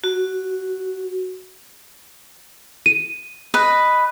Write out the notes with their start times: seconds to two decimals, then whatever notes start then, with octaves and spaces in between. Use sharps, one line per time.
0.04 F#4
2.86 D#7
3.54 B4 D#5